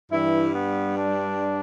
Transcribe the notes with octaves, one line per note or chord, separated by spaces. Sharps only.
G2 E3 G3 E4
B3
D4